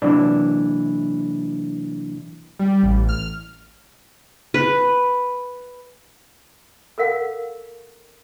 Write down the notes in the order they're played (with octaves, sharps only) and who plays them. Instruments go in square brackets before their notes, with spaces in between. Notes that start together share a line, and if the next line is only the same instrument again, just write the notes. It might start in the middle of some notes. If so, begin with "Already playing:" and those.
[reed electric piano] C3 E3 F#3 A#3 D4 E4
[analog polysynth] G3
A1
F6
[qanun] B4
[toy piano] A4 A#4 F5 F#5